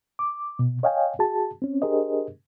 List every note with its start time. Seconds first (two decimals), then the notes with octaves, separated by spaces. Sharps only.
0.19 D6
0.59 B2
0.83 C#5 D#5 F5 G5 G#5
1.19 F#4 G#4 A5
1.62 C4 C#4
1.82 D4 G4 G#4 A#4 C5 D#5